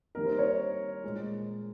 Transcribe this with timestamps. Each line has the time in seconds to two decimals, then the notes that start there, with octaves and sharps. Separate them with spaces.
0.15 D#3 G3 A#3 A#4
0.26 C5
0.39 C#5
1.04 A#2 G#3